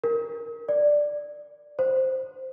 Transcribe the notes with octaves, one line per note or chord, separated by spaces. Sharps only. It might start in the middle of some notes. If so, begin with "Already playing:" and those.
A#4
D5
C5